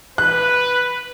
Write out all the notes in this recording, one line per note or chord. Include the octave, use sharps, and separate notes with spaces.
B4 F#6